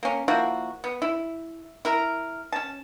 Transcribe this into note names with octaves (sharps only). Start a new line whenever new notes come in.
A#3 C#4
F3 A#3 E4 F#4
B3
E4
E4 A#4
C#4 A5